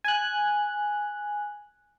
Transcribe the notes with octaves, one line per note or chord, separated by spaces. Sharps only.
G#5 F#6